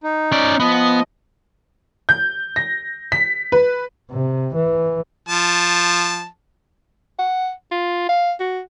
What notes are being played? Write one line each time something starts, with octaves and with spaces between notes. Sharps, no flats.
D#4
C#4 D5
F3 B3 D#5
G6
A#6
B6
B4
C3
E3
F3 A5
F#5
F4
F5
F#4